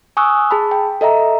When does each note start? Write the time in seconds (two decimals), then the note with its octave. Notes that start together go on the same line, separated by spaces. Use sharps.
0.17 G#5 C#6 D#6 E6 F#6
0.51 G#4 A5 B5
0.71 G5
1.01 A4 D#5 E5 A#5